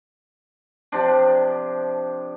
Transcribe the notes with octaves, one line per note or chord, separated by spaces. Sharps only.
C3 F3 D4